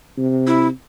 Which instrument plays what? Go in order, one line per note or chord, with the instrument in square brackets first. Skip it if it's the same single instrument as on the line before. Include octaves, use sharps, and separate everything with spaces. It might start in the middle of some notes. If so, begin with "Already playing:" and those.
[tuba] C3
[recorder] E4